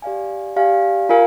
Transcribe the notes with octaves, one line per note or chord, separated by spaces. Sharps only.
G4 D5 F5 G#5
G4 D5 F5 G#5
F4 A#4 F5 G#5